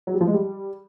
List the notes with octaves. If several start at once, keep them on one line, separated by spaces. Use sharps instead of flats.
F#3
G3
F3
G#3
G3